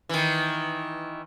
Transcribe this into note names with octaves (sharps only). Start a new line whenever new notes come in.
D#3 E3